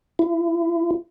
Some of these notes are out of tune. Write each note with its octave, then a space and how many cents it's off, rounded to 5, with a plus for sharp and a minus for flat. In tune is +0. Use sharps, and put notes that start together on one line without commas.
E4 +35